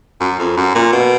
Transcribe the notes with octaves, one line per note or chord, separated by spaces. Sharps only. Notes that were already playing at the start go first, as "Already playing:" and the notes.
F#2
F2
F#2
A#2
B2